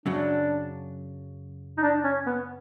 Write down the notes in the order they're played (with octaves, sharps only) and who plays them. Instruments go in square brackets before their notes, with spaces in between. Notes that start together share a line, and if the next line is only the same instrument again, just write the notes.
[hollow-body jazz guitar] F#2 C#3 F#3 [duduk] D4
[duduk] D#4
D4
C#4
B3